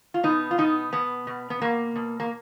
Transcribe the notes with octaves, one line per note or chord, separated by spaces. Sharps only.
F4
B2 B3 D#4
F4
B2 B3 D#4
B2 B3
B2
B3
B2 A#3
B2
A#3